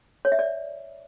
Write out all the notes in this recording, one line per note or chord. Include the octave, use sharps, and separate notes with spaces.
C#5
E5
D5